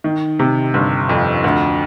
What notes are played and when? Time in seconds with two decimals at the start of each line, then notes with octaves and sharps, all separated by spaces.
0.04 D#3
0.39 C3
0.74 G1
1.09 F2
1.44 D2